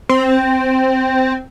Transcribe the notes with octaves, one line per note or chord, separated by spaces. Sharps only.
C4